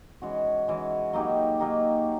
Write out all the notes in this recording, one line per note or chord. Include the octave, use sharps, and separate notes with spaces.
E3 G#3 C#4 F#4
E3 G#3 C#4 F#4
F#3 A#3 D#4 G4
F#3 A#3 D#4 G4